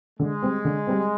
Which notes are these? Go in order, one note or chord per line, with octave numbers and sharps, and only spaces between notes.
D3 G#3
G3 C4
D3
G3 C4